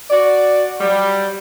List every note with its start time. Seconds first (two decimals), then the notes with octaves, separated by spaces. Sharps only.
0.10 F#4 D5
0.81 F#3 G3